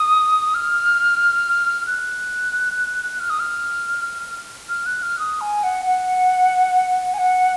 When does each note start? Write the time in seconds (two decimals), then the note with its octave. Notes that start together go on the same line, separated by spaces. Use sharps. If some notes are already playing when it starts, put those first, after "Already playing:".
Already playing: D#6
0.54 F6
1.87 F#6
3.20 F6
3.30 D#6
3.40 F6
4.69 F6
4.86 F#6
5.03 F6
5.19 D#6
5.41 G#5
5.63 F#5
5.86 F#5
7.14 G#5
7.18 F#5